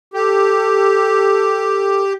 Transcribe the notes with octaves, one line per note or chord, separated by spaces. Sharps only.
G4 A4